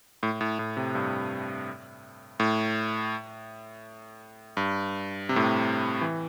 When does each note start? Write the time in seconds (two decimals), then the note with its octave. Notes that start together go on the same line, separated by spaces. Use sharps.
0.23 A2
0.41 A2
0.59 A2
0.77 C3
0.95 G2
2.40 A2
4.57 G2
5.29 C3
5.36 A2
5.43 C3
6.01 E3